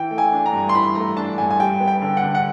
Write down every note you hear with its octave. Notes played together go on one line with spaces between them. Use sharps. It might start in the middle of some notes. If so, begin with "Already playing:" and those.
Already playing: E3 G5
A3
G#5
D4
A#5
G2
C6
E3 B5
A3 A#5
D4 A5
G2 G#5
G#5
G3 G5
B3
G5
D3
F#5
D3
F#5